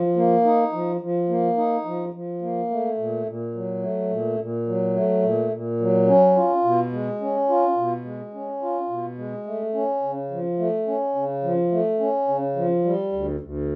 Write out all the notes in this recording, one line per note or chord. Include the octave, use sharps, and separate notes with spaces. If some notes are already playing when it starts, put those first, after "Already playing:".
Already playing: F3
A#3
D#4
F3
F3
A#3
D#4
F3
F3
A#3
A3
A#2
A#2
F#3
A3
A#2
A#2
F#3
A3
A#2
A#2
F#3
C#4
F4
B2
G#3
C#4
F4
B2
G#3
C#4
F4
B2
G#3
A3
C#4
C#3
F3
A3
C#4
C#3
F3
A3
C#4
C#3
F3
G3
D2
D2